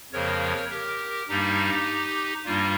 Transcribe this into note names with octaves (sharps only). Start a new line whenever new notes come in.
F2 C#3 F3 A#3 A#4 C#5
G4 A#4
G2 G3 A#3 D#4 G4
G2 G3 A#3 F4